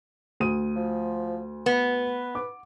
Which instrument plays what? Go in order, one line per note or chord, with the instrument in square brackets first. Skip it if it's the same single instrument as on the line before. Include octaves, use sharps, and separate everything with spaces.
[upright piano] D2 D#6 D#7
[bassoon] F3
[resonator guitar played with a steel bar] B3 [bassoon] B4
[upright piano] D6